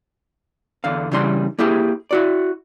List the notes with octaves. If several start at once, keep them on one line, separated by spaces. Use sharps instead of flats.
E2 D3 F5
C#3 E3 G3 D4 C6
A#3 E4 G4 G#4
E4 F#4 D5